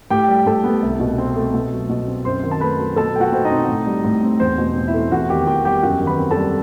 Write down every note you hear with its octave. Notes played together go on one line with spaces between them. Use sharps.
A2 G4 G5
G3
A2 A4 A5
B3
C2
B2
C4
A3
B2
F#3
B2
C4
F#2 C5 C6
D#3
A5
A3 B4 B5
F#3
B2 A4 A5
A3 G5
F#4 F#5
B2 C5
D#4 D#5
C4
A2
G3
A2
C4
E2 C5
B2
C4
E4 E5
A3
E2 F#4 F#5
D#3 G4 G5
E2 G4 G5
G3 G4 G5
F#2 F#4 F#5
D#3
B4 B5
C4
A4 A5
G3